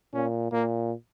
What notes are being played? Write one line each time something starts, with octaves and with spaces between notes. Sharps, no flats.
A#2 C#4
A#2 A#3